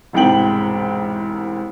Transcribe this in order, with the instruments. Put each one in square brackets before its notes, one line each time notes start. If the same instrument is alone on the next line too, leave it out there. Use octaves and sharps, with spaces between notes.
[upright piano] E1 C2 G#2 G5 F#7